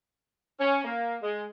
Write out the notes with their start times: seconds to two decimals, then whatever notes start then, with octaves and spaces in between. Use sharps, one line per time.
0.59 C#4
0.84 A#3
1.22 G#3